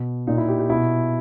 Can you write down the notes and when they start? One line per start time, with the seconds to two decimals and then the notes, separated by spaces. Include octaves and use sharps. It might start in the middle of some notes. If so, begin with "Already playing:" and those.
Already playing: B2
0.27 A#2 D#4
0.38 E4
0.48 G4
0.59 G4
0.70 B2 E4